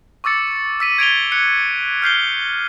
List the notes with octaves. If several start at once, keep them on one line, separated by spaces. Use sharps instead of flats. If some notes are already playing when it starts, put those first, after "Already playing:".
C#6 D6 E6 A6 C#7
E6 B6 D#7
G#6 D7 F7 G7
F#6 C#7
F6 G6 C7 G7